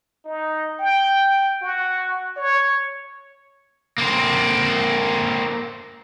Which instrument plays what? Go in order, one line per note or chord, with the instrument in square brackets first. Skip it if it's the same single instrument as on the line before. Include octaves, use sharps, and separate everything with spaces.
[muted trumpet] D#4
G5
F#4
C#5
[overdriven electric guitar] A#3 C4